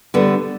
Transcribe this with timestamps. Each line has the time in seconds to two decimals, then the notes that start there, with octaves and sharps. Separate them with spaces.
0.14 D3 G3 B3